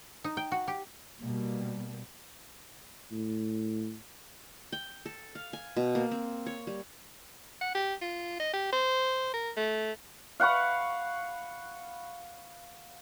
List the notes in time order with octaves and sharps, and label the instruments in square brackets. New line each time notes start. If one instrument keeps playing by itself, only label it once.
[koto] D#4
G5
F#4
G4
[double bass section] B2 G3 A#3
[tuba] A2
[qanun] G5
A4
F5
G#5
B2
A#3
C4
C#5
G3
[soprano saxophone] F#5
G4
F4
D#5
G4
C5
A#4
A3
[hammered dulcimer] F5 F#5 B5 C#6